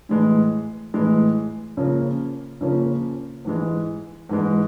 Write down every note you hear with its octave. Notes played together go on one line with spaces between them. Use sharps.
A2 E3 G#3
A2 E3 G#3
C#3 F3 A#3 C#4
C#3 F3 A#3 C#4
G#2 E3 G#3
G#2 E3 G#3